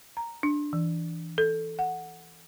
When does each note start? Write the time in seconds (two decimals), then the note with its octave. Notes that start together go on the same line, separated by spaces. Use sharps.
0.17 A#5
0.43 D4
0.73 E3
1.38 A4
1.79 F#5